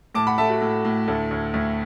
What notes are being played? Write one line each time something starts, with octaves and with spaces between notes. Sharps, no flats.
A2 A5 D6
F#5 B5
A3 E5 A5
F#4
A2
A2
D2 A4
D2
D2